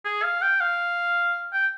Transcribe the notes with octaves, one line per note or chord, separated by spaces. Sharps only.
G#4
F5
G5
F5
G5